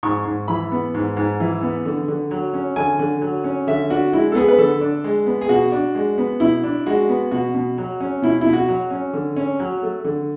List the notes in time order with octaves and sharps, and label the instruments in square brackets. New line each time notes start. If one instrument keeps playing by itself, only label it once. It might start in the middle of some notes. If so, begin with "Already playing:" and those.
[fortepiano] G#2 C#6
G#2
E3 B5
B3
G#2
G#2
E3
B3
D3
D3
F#3
C#4
D3 G#5
D3
F#3
C#4
D3 E5
D4 F#4
G#3 E4
A4
B3 G#4
B4
D3 A4
D4
G#3
B3
G#4
B2 F#4
D4
G#3
B3
B2 E4
D4
G#3 F#4
B3
B2 F#4
B2
F#3
C#4
B2 E4
B2 E4
F#4
F#3
C#4
D3
C#4
F#3
A3
D3